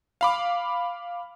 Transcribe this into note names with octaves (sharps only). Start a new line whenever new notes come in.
F5 B5 D6